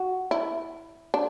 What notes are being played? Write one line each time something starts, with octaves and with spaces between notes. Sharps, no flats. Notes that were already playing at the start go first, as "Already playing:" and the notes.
Already playing: F#4
E4
D4